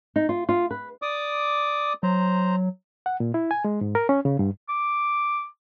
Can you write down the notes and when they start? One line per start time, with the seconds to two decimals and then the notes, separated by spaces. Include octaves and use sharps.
0.16 D#4
0.29 F4
0.49 F4
0.71 B4
1.02 D5 D6 D#6
2.03 F#3 C5 A#5
3.06 F#5
3.20 A#2
3.34 E4
3.51 G#5
3.65 G#3
3.81 G#2
3.95 A#4
4.09 C#4
4.25 C#3
4.39 G2
4.69 D6